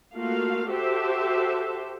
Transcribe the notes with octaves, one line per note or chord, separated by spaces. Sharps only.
A3 A#3 F4 F#4 F5
F#4 G4 A4 C5 E5